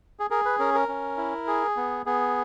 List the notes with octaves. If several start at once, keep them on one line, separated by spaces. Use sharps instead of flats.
G#4
G#4 A#4
B4
C#4 A#4
A#4
C#4
E4
G#4
B3
B3 G#4